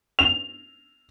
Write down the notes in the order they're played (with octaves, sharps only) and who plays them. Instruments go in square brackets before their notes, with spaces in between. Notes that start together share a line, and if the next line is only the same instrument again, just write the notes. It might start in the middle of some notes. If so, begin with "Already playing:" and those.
[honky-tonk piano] F7